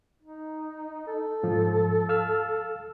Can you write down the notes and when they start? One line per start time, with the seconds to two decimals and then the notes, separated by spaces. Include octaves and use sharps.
0.22 D#4
1.07 A4
1.43 G#2 F3
2.09 F5 E6 F6